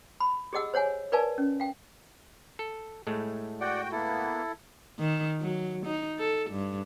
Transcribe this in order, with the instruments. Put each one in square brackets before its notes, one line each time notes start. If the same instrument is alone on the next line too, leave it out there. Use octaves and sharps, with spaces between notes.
[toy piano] B5
G4 G#4 D#5 F#5 E6
C5 C#5 F#5 G#5
A#4 B4 D5 F5 G#5 A5
C#4
F5 G5
[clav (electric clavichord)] A4
A2 G#3 A3
[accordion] F#4 G5 [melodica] D5 F#5
[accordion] A#3 B3 [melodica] E4 A4
[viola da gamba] D#3
F#3
D#4
A4
G2